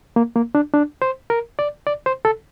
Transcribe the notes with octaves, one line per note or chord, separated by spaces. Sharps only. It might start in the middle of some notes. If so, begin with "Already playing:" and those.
A#3
A#3
D4
D4
C5
A#4
D5
D5
C5
A4